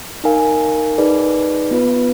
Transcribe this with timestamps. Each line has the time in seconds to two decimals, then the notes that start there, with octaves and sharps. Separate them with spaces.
0.24 D#4 A#4 F5 G#5
0.98 D#4 G#4 B4 D5
1.71 B3 F4 B4